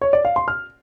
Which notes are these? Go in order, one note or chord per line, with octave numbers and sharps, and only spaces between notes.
C#5
D5
F5
C6
F6